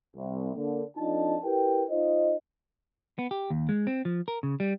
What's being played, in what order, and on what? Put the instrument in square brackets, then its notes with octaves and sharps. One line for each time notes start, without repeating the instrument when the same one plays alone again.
[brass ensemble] C2
D3 A#3
F2 D4 D#4 F4 A5
E4 G4 A#4 B4 G5
D#4 F4 C5 D#5
[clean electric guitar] B3
G4
D#2
G#3
C4
F3
A#4
C#3
G3